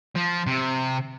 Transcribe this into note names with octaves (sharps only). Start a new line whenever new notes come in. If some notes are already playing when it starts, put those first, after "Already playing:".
F3
C3